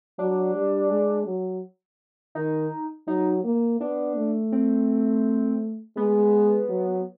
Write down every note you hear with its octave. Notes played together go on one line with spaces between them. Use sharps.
F#3 D4
G3
G#3
F#3
D#3 D#4
F#3 D#4
A#3
B3 D4
A3
C4
G#3 B3
F#3